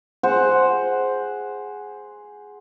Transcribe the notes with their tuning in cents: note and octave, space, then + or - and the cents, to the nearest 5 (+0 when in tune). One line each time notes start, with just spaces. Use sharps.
G#4 +0 C5 +0 F#5 +0